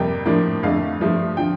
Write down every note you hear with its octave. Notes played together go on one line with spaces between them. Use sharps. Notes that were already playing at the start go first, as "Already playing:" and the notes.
Already playing: F2 C3 G3 A#3 G5
A2 F3 A#3 D4
F2 D3 A3 D4 F5
G2 F3 A3
D3 F3 G5